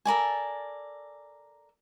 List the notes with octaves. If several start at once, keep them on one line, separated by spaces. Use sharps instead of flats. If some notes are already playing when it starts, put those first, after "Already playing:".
A4 A#4 D5 G#5